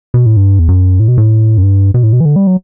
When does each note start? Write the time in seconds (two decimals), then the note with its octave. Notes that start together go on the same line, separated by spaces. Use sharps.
0.14 B2
0.26 A2
0.37 G2
0.59 E2
0.69 F#2
1.00 A2
1.08 B2
1.18 A2
1.58 F#2
1.63 G2
1.94 B2
2.03 A2
2.13 B2
2.20 E3
2.25 D3
2.36 G3
2.47 F#3